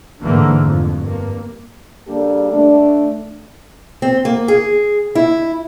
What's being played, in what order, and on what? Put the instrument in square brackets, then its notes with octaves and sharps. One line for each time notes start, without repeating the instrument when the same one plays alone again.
[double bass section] G#2 D3 E3 A3 A#3
F2
G2 A#3
[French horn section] C#3 G3 A#3 D4 G4 A4
A3 D4
[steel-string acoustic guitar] C4
A#3
G#4
E4